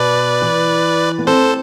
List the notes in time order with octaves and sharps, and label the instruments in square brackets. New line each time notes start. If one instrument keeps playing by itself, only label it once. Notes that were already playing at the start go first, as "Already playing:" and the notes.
Already playing: [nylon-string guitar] B2 [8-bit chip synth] B4 D5
[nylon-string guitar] E3
B3
[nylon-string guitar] C4 [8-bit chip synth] A4 C5